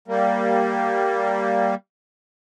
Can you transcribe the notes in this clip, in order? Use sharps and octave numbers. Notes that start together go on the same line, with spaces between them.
G3 A#3